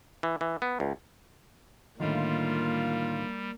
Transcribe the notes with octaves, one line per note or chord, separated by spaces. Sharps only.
E3
E3
B3
C#2
A2 D3 D#3 G3 A#3 F4